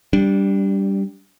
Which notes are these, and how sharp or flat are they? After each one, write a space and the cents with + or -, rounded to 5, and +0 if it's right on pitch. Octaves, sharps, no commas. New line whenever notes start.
G3 +0 D4 -20